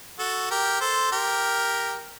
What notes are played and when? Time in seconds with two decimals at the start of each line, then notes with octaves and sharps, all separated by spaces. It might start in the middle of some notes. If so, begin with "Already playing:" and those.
0.19 F#4 A4
0.51 G4 A#4
0.81 A4 C5
1.12 G4 A#4